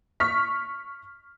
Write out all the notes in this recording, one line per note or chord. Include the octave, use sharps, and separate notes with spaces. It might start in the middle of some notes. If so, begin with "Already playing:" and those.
C#6 F6 B6